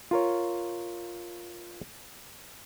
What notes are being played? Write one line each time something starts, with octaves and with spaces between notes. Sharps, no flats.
F4 A#4 C#5